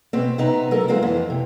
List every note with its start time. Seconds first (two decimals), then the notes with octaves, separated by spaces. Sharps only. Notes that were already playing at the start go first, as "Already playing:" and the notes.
0.13 B2 B3 C4
0.38 C3 B3 D#4 A#5
0.71 F#3 A4 A#4
0.88 F3 G#3 B3 C4 E4 F#4
1.02 F2 E3 B3
1.30 C3